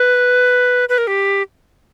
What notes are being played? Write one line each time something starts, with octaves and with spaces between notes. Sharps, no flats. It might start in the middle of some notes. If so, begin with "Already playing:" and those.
Already playing: B4
B4
A#4
G4